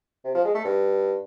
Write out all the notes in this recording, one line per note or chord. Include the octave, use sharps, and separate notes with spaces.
C3
F3
G#3
A3
G2